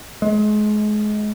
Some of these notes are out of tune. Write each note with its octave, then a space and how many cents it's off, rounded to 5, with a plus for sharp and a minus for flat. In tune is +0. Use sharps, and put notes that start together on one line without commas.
G#3 +30